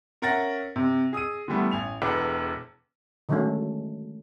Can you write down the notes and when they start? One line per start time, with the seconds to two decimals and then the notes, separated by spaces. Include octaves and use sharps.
0.22 C#4 A#4 E5 F#5 A6 A#6
0.76 C3
1.13 G#4 D#6 E6 D#7
1.48 D3 E3 G3 A3 B3
1.71 A1 G#5 F7
2.02 E1 E2 A4 B4 D6
3.29 D3 D#3 F#3 G#3 A3 C#4